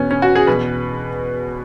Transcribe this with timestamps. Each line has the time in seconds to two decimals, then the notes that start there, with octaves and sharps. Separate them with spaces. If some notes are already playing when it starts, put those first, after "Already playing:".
Already playing: E2 B2 B3 C#4
0.11 C#4
0.22 F#4
0.35 G#4
0.47 E2 B2 B4